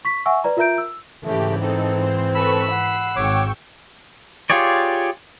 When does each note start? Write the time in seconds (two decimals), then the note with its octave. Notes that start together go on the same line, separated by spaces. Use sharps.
0.05 C#6 B6
0.26 E5 F#5 G#5 C#6 E6
0.44 B4 D5 A#5
0.57 F4 A#4 E5 A#5 G6 D7
0.78 E6
1.25 G#2 C#3 E3 A3 G4
1.60 C4 D#4 A4
2.02 C5
2.35 A4 B4 B5 C#6 E6
2.71 F#5 C7
3.16 G#1 G#2 C#5 G5 C#6 D6 E6
4.50 F4 G4 G#4 C#5 D5